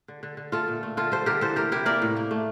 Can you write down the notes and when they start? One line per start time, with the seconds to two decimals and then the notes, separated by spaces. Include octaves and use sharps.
0.08 D3
0.23 D3
0.37 D3
0.52 A3 F4 A4
0.68 A#2
0.83 A3
0.97 D3 F4 A4
1.12 G3 A4 C5
1.26 D3 G4 A#4
1.41 E3 A4 C5
1.56 A3 G4 A#4
1.71 C3 E4 G4
1.86 A#3 A#4 D5
2.02 A2
2.17 A#3
2.31 A3